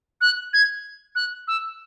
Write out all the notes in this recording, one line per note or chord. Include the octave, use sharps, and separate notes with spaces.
F#6
G#6
F#6
E6